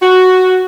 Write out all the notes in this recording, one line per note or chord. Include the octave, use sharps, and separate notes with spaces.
F#4